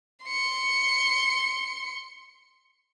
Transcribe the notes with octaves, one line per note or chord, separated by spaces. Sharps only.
C6 C#7